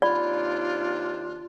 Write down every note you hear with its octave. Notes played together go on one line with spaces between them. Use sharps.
D#2 C3 D4 F4 D5 B5